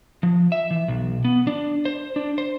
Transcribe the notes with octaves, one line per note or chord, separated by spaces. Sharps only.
F3
E5
E3
B1
B3
D4
C5
D4
C5